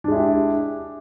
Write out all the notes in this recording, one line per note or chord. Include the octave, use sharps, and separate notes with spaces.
G#3 D4 E4 G4